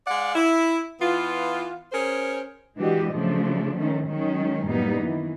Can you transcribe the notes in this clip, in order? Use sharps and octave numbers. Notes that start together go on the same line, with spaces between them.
G#3 D5 F5 F#5
E4
E3 B3 F4
C#4 G#4 A#4 C5
E3 G#3 D4 F#4 G4 D#5
C#3 F3 F#3 A3 D4
D#3 A3 C#4
D#3 F#3 G#3 C#4
F#2 A2 G3 A#3 B3 D#4
D#3 E3